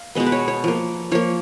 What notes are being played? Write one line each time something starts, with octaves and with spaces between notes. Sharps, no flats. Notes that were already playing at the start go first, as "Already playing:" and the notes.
Already playing: F5
B2 G#3 B3 D#5
B4
C#5
C#5
F3 A#3
F3 A#3 C#5